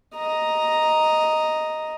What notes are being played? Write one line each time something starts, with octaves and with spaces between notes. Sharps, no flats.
D#5 A#5